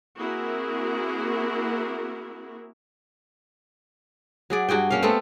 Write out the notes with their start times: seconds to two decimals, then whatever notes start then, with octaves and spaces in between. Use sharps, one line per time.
0.18 A#3 C4 E4 F#4 G#4 A#4
4.50 F#3 G#4 D5
4.69 G2 F#4 G#4 G5
4.91 A#3 C#4 F5
5.02 A3 B3 C4 A4